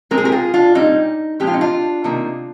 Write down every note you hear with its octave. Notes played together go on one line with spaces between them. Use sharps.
A#2 G#3 C4 A#4
G#4
G4 A#4
F4 G#4
D4 F4
A#2 G3 C4 D#4
A#2 F3 G#3 C4 G4
F4
D#4
D4 F4
C3 D#3 A#3